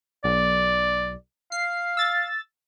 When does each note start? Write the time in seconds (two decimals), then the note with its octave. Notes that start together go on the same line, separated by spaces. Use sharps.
0.24 B1 D5
1.52 F5 C7
1.97 E6 A6